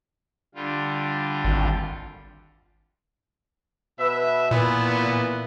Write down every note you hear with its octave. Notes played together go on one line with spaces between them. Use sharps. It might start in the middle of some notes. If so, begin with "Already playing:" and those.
D3 G3 F4
G#1
B2 B4 E5
A#2 E3 A#3 B3